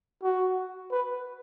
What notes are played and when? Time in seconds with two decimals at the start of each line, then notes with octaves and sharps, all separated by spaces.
0.22 F#4
0.92 B4